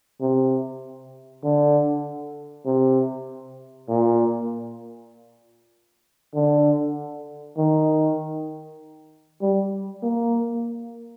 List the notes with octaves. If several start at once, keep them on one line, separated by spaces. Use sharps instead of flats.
C3
D3
C3
A#2
D3
D#3
G3
A#3